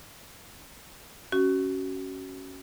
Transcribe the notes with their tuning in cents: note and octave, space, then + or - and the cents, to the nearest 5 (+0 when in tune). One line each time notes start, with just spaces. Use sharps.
C#4 +0 F#4 +25